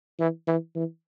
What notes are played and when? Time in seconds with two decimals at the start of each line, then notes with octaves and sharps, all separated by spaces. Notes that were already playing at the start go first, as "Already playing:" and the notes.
0.20 E3
0.47 E3
0.76 E3